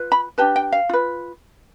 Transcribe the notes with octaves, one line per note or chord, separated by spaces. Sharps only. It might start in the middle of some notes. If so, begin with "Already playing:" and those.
Already playing: F4 B4
B5
D4 G4 B4 A5
G5
F5
F4 B4